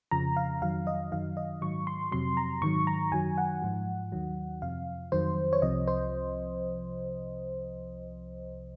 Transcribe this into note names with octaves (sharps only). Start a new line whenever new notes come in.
F2 C#3 F3 A#5
F5
F2 D#3 F#3 F5
D#5
F#2 D#3 F#3 F5
D#5
G#2 D#3 F#3 C#6
C6
F2 C3 F#3 C6
A#5
G#2 D#3 F#3 C#6
A#5
F#2 D#3 F#3 G#5
F#5
G#2 F3
D#2 D#3 F#3
F2 C3 F3 F5
F2 D#3 F#3 C5
C#5
C2 C3 F3 D#5
C5